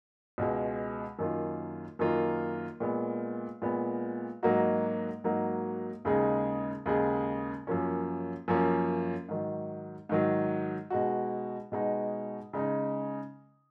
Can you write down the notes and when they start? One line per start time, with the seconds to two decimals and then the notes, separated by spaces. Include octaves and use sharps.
0.38 C#2 B2 G#3
1.19 F#2 D#3 A#3 F4
1.99 F#2 D#3 A#3 F4
2.80 A#2 G#3 B3
3.62 A#2 G#3 B3
4.43 G#2 F#3 A#3 D#4 F#4
5.24 G#2 F#3 A#3 D#4 F#4
6.05 D#2 C#3 G#3 D#4 G#4
6.86 D#2 C#3 G#3 D#4 G#4
7.67 F#2 F3 A#3 C#4
8.48 F#2 F3 A#3 C#4
9.29 G#2 D#3 F#3
10.09 G#2 D#3 F#3
10.90 B2 G#3 D#4 F#4
11.72 B2 G#3 D#4 F#4
12.53 C#3 G#3 D#4